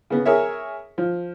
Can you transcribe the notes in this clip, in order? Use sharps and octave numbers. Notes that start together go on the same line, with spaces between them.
C#3 B3
G#4 A#4 C#5 E5
F3